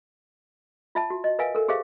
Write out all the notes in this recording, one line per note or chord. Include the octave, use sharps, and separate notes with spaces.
F4 E5 A5
F#4
D#5
A#4 B4 E5 F5 G#5
A4 A#4
G4 G#4 C5 E5 F5